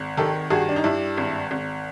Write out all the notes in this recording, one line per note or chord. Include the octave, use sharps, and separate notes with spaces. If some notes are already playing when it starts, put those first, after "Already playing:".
Already playing: G#1
D#3 G4 A4
G2 F#4 G#4
D4
D#4
G2 D4 E4
G#1
G#1